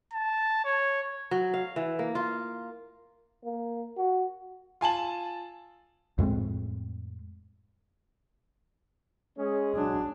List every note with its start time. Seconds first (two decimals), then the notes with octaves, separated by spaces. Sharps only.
0.13 A5
0.65 C#5
1.31 F#3
1.54 F5
1.76 E3
1.99 A#3
2.15 F4
3.44 A#3
3.97 F#4
4.81 F4 G#5 A5 F#7
6.18 F2 A2 G#3 C4
9.38 G#3 C#4 G#4
9.75 F#3 D4